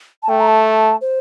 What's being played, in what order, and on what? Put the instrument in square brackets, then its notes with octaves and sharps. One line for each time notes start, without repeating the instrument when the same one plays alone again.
[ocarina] A5
[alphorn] A3 [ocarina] G5
[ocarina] A#5
A5
C5